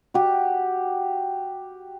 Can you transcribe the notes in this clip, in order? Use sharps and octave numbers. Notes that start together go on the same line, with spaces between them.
F#4 G4